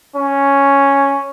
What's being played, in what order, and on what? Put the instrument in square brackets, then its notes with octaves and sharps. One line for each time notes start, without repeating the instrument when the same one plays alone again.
[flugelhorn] C#4